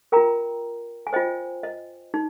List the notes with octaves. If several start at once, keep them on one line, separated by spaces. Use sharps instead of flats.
F4 A#4 G5 A#5
G#5
F4 C5 D#5 G5
D#5
D#4